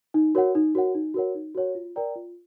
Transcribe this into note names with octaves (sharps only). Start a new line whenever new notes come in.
D#4
F#4 A#4 C#5 F#5
D#4
F#4 A#4 C#5 F#5
D#4
F#4 A#4 C#5 F#5
D#4
F#4 A#4 C#5 F#5
F4
A#4 D5 G5 A#5
F4